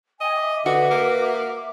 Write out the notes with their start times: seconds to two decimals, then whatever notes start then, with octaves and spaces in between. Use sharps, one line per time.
0.21 D#5 G5 G#5
0.36 E5 D6
0.66 D3 F#4 B4
0.91 A#3